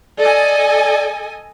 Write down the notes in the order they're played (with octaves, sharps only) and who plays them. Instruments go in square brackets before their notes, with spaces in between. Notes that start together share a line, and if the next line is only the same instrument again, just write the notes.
[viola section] A4 D#5 G#5 [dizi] D5